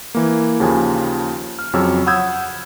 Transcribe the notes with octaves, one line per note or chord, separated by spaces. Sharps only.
E3 A#3
D#2 C#3 F3 G#5 A5
F6
F2 C#3 F#3 C#5 E6
F#5 B5 D#6 E6 G6 G#6